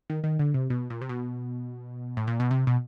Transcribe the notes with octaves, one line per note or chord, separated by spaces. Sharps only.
D#3
D#3
D3
C3
B2
A#2
C3
B2
A2
A#2
B2
C3
B2